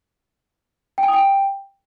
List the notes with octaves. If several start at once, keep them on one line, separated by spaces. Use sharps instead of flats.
G5
G#5
D#6
G5